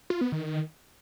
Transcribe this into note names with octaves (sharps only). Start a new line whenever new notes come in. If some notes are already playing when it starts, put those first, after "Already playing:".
F4
B3
D#3